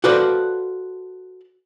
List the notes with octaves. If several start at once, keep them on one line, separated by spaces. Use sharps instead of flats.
F#4 A4 B4 C5 D5 F5